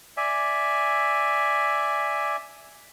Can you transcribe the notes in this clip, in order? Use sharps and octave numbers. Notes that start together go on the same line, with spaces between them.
D5 E5 G#5